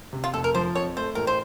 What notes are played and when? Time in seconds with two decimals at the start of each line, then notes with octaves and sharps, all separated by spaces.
0.13 C3
0.24 F4
0.34 F1 A4
0.44 A#4
0.55 F3 C5
0.75 F2 C#5
0.97 A3 C5
1.15 A1 A#4
1.27 C5